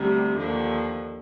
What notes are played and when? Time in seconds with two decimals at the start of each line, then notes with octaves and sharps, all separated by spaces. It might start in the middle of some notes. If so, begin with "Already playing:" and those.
Already playing: D2 C3 G3
0.37 D#2 D3 F3